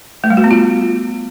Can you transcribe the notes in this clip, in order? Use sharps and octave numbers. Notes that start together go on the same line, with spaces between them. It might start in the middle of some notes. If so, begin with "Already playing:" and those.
A3
G3
F#4
B3
F4